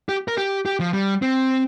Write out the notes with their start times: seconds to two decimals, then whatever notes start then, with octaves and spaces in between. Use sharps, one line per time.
0.09 G4
0.28 A#4
0.38 G4
0.66 G4
0.80 F3
0.93 G3
1.22 C4